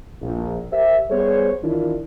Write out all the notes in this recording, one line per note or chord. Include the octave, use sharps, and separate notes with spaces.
A#1
G4 A#4 C5 E5
G3 B3 G4 G#4 C5 C#5
D#3 E3 D4 E4 F4 A#4